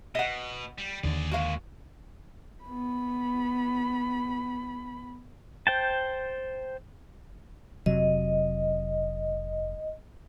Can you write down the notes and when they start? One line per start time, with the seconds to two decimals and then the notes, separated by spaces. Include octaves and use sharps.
0.15 B2 D#5 F#5
0.78 G3
1.04 D#2 D3 G#4 D5
1.32 G#3 A#3 F#4 F5
2.64 B3 B5
5.67 C5 G5 A5
7.86 F1 C3 F#3 D#5